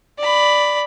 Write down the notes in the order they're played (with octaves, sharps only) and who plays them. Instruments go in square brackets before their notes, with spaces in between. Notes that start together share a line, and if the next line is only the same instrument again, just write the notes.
[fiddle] D5 B5